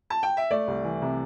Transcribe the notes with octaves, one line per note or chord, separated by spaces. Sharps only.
A5
G5
E5
A3 D5
C2
E3
C3